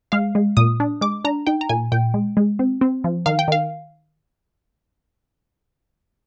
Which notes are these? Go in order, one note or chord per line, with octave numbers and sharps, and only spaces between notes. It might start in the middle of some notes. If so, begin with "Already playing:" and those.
G#3 F5
G#3
A#2 D#6
D4
G#3 D6
D4 A#5
D#4 G5
A#5
A#2 G#5
A#2 G5
G#3
G#3
C4
C4
F3
D#3 F5
G5
D#3 F5